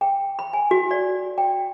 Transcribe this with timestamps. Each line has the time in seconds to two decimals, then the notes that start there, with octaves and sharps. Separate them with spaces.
0.01 G5
0.39 B5
0.53 G#5
0.71 F#4
0.91 D5
1.38 G5